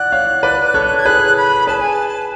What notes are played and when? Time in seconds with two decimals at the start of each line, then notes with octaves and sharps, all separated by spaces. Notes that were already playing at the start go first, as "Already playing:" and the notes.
Already playing: D5 F#5 F#6
0.12 C#5 F5
0.43 B4 D5
0.74 A4 C#5
0.98 G#6
1.05 G#4 B4 F#6
1.36 B5
1.67 G#4 B4 A5
1.80 G#5
1.92 A5